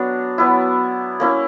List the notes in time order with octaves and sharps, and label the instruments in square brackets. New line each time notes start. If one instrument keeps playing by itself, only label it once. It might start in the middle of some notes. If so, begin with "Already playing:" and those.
Already playing: [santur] F#3 B3 D4
F#3 B3 E4
A#3 C#4 E4